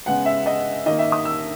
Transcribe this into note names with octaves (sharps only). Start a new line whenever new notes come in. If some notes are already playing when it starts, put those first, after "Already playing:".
C#3 G#3 B3 F#5
E5
D#5
D#3 A#3 D#5
E5
D#6
E6